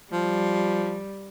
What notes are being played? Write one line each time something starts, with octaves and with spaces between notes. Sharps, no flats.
F3 G3